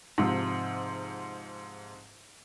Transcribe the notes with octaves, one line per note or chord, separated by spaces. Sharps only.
G#2 C3 F3